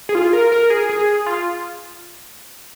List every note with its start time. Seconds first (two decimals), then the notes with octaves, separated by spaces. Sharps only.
0.09 G#4
0.15 F4
0.33 A#4
0.52 A#4
0.70 G#4
0.89 G#4
1.26 F4